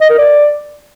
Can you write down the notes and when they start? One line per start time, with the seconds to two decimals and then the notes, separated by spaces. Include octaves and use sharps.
0.01 D#5
0.09 A#4
0.18 D5